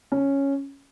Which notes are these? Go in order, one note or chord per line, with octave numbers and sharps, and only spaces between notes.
C#4